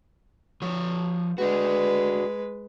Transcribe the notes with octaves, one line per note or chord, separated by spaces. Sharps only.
F3 C#5
G#3 D4 F#4 B4